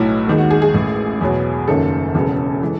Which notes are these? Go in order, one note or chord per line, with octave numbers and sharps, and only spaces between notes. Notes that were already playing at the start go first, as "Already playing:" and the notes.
Already playing: B1 A2 F#3 E4
D#2 D#3 G#3
F#4
G#4
G#4
A1 A2 G#3
E2 B2 F#3
F#1 F#2 D#3 F#3 A4
E1 E2 C#3 F#3
E3 G#3